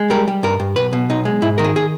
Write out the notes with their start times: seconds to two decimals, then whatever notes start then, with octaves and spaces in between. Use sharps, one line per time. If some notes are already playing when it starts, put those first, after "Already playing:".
Already playing: G#3
0.10 G3 A#4
0.28 G3
0.43 G2 A#4
0.60 G2
0.76 B1 B4
0.93 B2
1.10 B1 D#4
1.25 G#3
1.42 G#2 E4
1.58 D#3 A#4
1.64 G#4
1.76 G#4